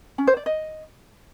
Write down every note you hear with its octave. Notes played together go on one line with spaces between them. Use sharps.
C#4
C5
D5
D#5